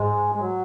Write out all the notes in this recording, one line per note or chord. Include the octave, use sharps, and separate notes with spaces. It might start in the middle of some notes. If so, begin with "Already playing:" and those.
Already playing: G#2 G#3
G#3
F#3